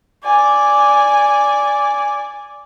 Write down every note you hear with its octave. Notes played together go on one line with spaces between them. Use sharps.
D5 G#5